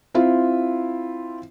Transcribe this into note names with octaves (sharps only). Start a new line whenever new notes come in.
C4 E4 F4